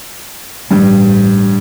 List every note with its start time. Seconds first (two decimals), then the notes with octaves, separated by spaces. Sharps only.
0.71 A1 G2